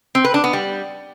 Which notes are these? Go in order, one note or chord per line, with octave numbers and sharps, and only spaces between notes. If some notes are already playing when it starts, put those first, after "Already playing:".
C4
B4
D4
B3
G3